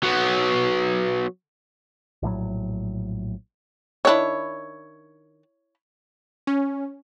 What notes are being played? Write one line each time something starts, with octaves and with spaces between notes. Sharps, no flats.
F#3 B3
A#1 A2 F3 F#3
D#3 D4 E4 C#5
C#4